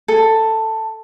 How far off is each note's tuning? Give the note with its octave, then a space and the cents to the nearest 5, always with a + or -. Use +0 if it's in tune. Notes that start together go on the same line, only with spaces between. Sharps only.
A4 +10